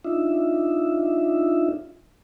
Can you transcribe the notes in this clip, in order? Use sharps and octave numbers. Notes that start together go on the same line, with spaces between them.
D4 D#4 F4 E5